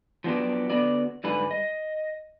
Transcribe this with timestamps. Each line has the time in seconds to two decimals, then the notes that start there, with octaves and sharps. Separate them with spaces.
0.24 F3 F#3 B3 D4 G4
0.70 D3 B3 F#4 D5
1.24 G#2 D3 G3 B4 G#5
1.51 D#5